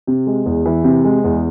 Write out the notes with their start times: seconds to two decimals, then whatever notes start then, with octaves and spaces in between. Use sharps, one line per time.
0.07 C3
0.27 G#3
0.46 E2
0.66 E3
0.84 C3
1.05 G#3
1.24 E2